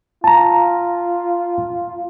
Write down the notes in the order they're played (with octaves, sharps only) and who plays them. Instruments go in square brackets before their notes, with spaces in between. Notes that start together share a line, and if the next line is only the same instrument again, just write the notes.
[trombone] F4 [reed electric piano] A5 A#5